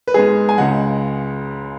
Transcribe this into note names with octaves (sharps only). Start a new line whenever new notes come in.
B4
G#2 G#3 B3 G#4
G#5
C#2 C#3 G#3 F#5